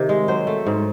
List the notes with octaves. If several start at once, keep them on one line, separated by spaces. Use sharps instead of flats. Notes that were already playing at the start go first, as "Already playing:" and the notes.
Already playing: C3 D#3
G#3
F#3 C5
A3
G#2